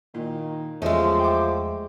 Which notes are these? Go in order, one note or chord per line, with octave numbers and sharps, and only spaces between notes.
A#2 D#3
E2 F3 G#3 A3 C#4 C5 D#5 E5
G5 D6